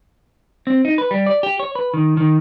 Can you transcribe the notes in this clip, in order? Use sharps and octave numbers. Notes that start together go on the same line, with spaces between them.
C4
D#4
B4
G3
D5
G4
C#5
B4
D#3
D#3